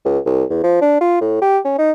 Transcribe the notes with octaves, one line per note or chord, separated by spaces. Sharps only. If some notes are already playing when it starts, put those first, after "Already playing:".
C#2
C2
E2
F3
D4
F4
A2
G4
C#4
D#4